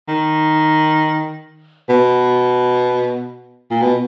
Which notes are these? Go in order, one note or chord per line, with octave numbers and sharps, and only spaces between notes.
D#3
B2
A#2
B2